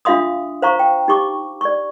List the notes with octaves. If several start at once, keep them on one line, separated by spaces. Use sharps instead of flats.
D4 F4 E5 F5 C6 D#6
C5 F5 A#5 C#6
G5
D#4 G4 C#6 D6
D5 C#6